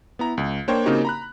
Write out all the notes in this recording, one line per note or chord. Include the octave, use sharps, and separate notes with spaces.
B3 E4 A#5
C#2
A#3 D4 C5 C#5 G5
C#3 A#3 C4 D#4 F#4 G4
A#5 B5 F#6